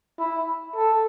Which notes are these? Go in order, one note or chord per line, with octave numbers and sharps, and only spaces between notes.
E4
A4